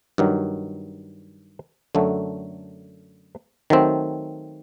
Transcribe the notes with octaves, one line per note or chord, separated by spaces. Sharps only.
G2 D#3 F#3
F#2 D3 F#3 A3
D#3 F#3 A3 C4